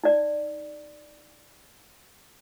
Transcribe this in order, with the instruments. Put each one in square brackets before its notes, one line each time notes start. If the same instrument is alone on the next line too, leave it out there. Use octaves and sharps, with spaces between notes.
[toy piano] D#4 D5